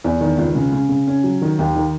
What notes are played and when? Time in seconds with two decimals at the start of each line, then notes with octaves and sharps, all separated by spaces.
0.04 E2
0.21 D#3
0.38 C#2
0.55 C#3
0.72 C#3
0.89 C#3
1.07 C#4
1.24 F#3
1.42 D#3
1.59 D#2
1.76 D#3